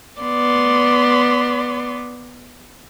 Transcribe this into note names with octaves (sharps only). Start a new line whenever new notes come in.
B3 D5 C6